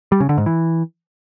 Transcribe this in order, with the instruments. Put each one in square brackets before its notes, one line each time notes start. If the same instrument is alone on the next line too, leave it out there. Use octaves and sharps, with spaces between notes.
[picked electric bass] G3
C#3
D3
G#2
E3